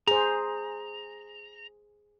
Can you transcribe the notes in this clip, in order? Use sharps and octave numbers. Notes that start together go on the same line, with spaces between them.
G#4 C5 A#5